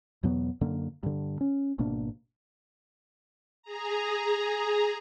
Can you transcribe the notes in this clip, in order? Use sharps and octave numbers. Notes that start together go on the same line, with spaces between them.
E2 B2 F#3 B3
F#2 D3 A#3
G2 D3
C#4
G#1 B2 A#3 D4
G#4 A#5